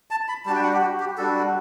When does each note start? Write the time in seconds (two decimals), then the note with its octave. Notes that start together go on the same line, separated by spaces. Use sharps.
0.11 A5
0.28 B5
0.46 G3 D4 F#4 A5
0.56 G5
0.63 F#5
0.73 G4
0.81 F#4
1.00 G4
1.18 G3 D4 F#4 A4